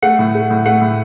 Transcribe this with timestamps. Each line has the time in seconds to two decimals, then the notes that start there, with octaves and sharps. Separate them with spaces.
0.03 A3 F#5
0.19 A2
0.35 A3
0.51 A2
0.65 A3 F#5
0.81 A2